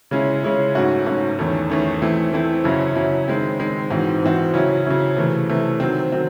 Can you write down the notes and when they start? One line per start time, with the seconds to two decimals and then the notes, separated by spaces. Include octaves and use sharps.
0.11 C#3 G#3 C#4 E4
0.43 C#3 G#3 C#4 E4
0.75 G#2 F#3 A3 C#4 F#4
1.06 G#2 F#3 A3 C#4 F#4
1.39 E2 D#3 A3 C#4
1.70 E2 D#3 A3 C#4
2.02 E3 A3 C4 E4
2.33 E3 A3 C4 E4
2.64 F#2 C#3 F#3 C#4 E4
2.95 F#2 C#3 F#3 C#4 E4
3.28 D#3 G#3 C4
3.59 D#3 G#3 C4
3.90 G#2 E3 C4 F#4
4.23 G#2 E3 C4 F#4
4.53 C#3 F#3 C#4 E4
4.86 C#3 F#3 C#4 E4
5.17 C3 E3 A3
5.49 C3 E3 A3
5.80 D#3 F#3 C4
6.12 D#3 F#3 C4